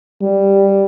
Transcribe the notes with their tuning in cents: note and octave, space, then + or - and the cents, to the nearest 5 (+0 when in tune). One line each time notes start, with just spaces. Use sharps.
G3 +5